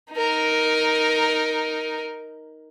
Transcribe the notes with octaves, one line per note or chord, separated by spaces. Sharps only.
D#4 A#4